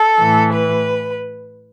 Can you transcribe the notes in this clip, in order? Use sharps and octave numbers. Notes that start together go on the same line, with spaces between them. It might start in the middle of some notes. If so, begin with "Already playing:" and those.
Already playing: A4
A2 E3
B4